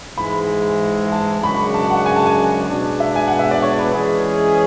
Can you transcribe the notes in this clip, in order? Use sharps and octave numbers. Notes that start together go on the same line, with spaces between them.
G#2 E3 G#3 B5
A5
F#2 C#3 G#3 D4 F#4 B5
A5
F#5
G#5
A5
G#5
B2 G#3 B3 D4
E5
G#5
F#5
E5
D5
C#5
B4
E3 G#3 C#4 G#4